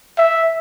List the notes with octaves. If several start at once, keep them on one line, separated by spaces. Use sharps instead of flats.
E5